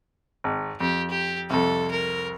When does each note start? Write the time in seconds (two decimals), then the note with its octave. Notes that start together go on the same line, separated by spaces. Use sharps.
0.44 G#1
0.81 F2 G4
1.10 G4
1.50 C2 F2 A4
1.91 A#4